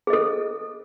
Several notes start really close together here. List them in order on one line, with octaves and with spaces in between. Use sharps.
G#4 D#5 A4